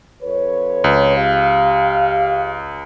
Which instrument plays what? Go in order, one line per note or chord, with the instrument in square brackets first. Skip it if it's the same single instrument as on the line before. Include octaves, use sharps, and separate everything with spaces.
[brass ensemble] F2 B4 C#5
[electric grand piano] C#2
[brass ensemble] G4 F5